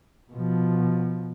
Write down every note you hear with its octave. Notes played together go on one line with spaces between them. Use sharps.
B2 F3